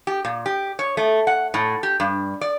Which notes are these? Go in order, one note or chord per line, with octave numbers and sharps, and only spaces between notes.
G4
A#2
G4
C#5
A3
F#5
A2
G4
G2
D5